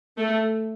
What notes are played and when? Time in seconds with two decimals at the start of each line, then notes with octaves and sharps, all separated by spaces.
0.19 A3